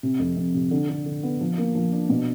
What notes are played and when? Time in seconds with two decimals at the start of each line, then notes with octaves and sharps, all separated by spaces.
0.03 C3
0.19 F2
0.37 F2
0.54 C3
0.71 D3
0.89 D3
1.06 D3
1.23 B3
1.41 F3
1.58 A#3
1.75 F3
1.93 D4
2.09 B2